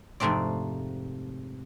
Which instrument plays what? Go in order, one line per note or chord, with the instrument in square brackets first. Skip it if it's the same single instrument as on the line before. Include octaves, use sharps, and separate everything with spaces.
[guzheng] F2 G#2 C3 A3 C4 D5